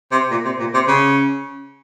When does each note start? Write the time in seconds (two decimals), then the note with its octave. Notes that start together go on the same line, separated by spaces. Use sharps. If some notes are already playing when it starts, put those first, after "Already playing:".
0.12 C3
0.31 A#2
0.45 C3
0.59 A#2
0.74 C3
0.88 C#3